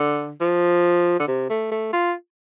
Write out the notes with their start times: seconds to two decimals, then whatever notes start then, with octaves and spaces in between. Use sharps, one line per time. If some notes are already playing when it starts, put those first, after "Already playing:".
Already playing: D3
0.41 F3
1.20 D3
1.28 C3
1.50 A3
1.71 A3
1.93 F4